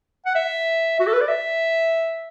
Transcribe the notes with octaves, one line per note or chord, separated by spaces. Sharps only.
F#5
E5
F#4
A4
B4
D5
E5